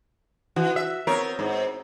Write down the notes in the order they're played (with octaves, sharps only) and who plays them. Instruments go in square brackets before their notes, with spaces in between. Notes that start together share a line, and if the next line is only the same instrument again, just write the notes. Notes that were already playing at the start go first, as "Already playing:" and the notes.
[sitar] E3 [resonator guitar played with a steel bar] F#4
[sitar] E5
[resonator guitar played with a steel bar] B3 C4 C#5 [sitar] A#4
[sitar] G#2